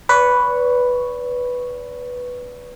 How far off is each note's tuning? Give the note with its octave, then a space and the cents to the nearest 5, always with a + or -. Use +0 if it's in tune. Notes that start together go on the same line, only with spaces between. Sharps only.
B4 +0 D5 -40 C#6 +0